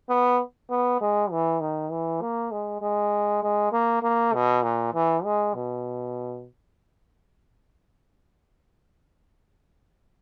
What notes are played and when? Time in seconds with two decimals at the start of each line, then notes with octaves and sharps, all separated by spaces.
0.09 B3
0.70 B3
1.01 G#3
1.31 E3
1.60 D#3
1.91 E3
2.21 A#3
2.51 G#3
2.81 G#3
3.43 G#3
3.72 A#3
4.03 A#3
4.34 B2
4.63 A#2
4.94 E3
5.24 G#3
5.54 B2